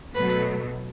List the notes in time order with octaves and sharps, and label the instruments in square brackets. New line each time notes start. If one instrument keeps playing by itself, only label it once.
[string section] B2 F#3 A3 [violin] B4